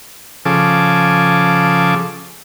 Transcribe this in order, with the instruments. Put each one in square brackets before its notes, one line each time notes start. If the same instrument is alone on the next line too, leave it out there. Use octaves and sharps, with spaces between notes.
[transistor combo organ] C#3 F3 G#4 A4 D6